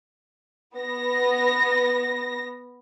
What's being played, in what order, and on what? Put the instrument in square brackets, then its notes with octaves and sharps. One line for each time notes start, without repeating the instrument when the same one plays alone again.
[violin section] B3 A#6